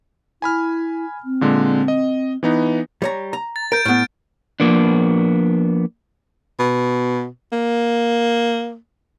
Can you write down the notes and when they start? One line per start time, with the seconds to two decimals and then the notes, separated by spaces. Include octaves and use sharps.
0.42 E4 G#5 B5 F6
1.25 C4
1.41 A#2 D3 G#3
1.88 D#5
2.43 E3 B3 D#4
3.02 G3 C#5 A#5
3.33 A#5
3.56 A6
3.72 A#4 G6 D7
3.85 A2 B3 F6
4.60 F3 A#3 B3 D4
6.59 B2
7.52 A#3